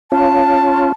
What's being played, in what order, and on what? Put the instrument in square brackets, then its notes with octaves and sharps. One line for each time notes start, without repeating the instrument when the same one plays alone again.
[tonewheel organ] C#4 F4 [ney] A5